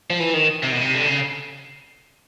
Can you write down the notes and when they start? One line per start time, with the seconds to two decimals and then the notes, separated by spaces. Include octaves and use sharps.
0.10 F3
0.20 E3
0.34 D#3
0.63 C3
0.72 B2
0.81 C3
0.95 D3
1.07 C#3